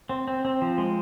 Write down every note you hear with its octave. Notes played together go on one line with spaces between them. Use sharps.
C4
C4
C4
F3
G#3